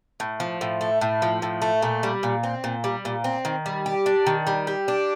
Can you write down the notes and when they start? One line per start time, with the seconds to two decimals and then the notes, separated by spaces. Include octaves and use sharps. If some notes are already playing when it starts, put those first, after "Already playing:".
0.20 A2
0.40 F3
0.61 A2
0.81 A3
1.01 A2
1.22 F3
1.42 A2
1.62 A3
1.82 A#2
2.03 G3
2.23 A#2
2.44 C4
2.64 A#2
2.84 G3
3.05 A#2
3.24 C4
3.45 D#3
3.66 G3
3.86 G4
4.06 D4
4.27 D#3
4.47 G3
4.67 G4
4.88 D4